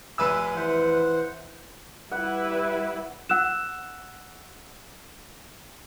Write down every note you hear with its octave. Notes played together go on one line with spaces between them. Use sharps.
F1 B4 E5 G#5 E6
E3 C5 F#5
G3 E4 B4 F#5
F#5 E6 F#6 E7